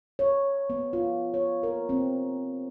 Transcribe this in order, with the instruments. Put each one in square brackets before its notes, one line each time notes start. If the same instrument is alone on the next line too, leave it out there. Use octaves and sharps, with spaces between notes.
[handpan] C#5
B3
F4
C#5
A#4
C4